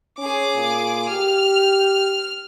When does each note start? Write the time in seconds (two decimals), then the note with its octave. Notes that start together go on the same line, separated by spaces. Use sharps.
0.18 C#4 G#4 D6
0.55 A#2
1.09 G4 F6